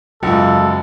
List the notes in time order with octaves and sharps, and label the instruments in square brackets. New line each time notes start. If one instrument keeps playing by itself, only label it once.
[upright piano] F#1 G#2 [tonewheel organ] F#3 [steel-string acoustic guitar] F4 F#4 [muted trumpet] A4